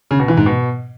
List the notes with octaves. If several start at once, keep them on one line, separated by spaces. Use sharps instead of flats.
C#3
B2
E3
G#2
B2